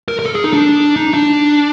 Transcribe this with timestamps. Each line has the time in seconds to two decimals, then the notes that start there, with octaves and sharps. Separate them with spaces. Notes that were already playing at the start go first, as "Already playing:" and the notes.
0.08 A#4
0.19 A#4
0.26 A4
0.35 G#4
0.44 D#4
0.53 D4
0.96 D#4
1.14 D4